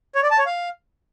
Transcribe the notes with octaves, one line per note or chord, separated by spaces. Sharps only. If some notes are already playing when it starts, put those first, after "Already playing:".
C#5
D5
A5
C#5
F5